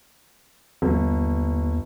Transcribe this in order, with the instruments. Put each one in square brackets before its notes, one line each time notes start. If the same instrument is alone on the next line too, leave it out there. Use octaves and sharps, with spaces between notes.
[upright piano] G1 [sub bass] D#2